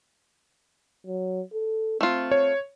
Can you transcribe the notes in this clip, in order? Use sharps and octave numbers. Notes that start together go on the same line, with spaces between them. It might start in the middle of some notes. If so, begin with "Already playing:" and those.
F#3
A4
A3 C4 F4
C#5